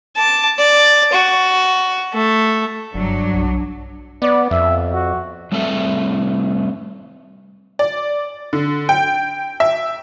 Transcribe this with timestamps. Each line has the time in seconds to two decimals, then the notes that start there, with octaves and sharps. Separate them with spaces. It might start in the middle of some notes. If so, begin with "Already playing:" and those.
0.16 A5 D6
0.58 D5
1.13 F#4
2.14 A3
2.94 F#1 G2 F#3 G3 D4
3.33 B1
4.22 B3 D5
4.51 F2 E5
4.93 F#4
5.52 G3 A3 C4 A4 E5
7.79 D5
8.53 D3
8.89 G5
9.60 E5